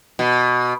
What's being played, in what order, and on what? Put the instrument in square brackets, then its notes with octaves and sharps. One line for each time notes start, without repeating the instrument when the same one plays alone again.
[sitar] B2